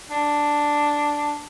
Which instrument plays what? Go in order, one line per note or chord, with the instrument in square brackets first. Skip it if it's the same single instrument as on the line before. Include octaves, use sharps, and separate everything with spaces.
[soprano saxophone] D4